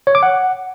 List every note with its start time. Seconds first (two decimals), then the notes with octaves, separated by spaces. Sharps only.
0.07 C#5
0.15 D6
0.23 F#5